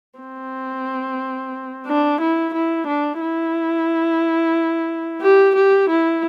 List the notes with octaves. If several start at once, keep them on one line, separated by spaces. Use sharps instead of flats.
C4
D4
E4
E4
D4
E4
G4
G4
E4